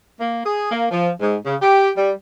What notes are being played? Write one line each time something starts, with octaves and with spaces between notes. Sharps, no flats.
A#3
G#4
A#3
F3
G#2
C#3
G4
G3